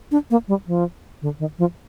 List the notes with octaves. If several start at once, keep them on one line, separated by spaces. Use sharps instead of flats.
D4
A#3
G3
F3
D3
D#3
F3